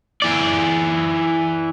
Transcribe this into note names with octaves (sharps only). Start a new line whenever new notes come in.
E3 D5